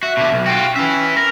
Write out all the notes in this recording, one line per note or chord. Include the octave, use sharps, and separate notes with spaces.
F#4 E5
B2 D3
B1
F4 F#4 G5
C#4 B4 E5
A#4